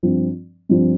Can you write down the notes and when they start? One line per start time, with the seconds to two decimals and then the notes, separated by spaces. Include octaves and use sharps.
0.03 G2 F3 C4
0.69 G2 F3 C4